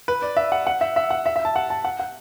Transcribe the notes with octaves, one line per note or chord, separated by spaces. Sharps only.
B4
D5
E5
F#5
F#5
E5
E5
F#5
E5
E5
A5
F#5
A5
F#5
F#5